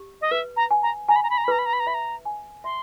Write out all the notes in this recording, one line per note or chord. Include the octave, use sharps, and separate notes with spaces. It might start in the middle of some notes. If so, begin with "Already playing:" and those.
Already playing: G4
D#5
B4 E5
A#5
G#5
A#5
G#5 A#5
B5
A#5
B5
A#5
B5
B4 A#5
B5
A#5
B5
A#5
E5 B5
A#5
G#5
E5 C6